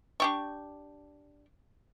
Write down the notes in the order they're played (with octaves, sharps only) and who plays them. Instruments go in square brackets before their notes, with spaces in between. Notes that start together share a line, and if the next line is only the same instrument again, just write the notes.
[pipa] D4 G4 C#6